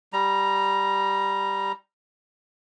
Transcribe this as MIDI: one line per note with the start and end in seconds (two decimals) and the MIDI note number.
0.13 1.72 55
0.13 1.72 82